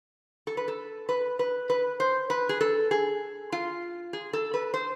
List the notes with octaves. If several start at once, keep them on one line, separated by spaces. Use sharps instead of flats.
A4
B4
A4
B4
B4
B4
C5
B4
G#4
A4
G#4
F4
G#4
A4
B4
C5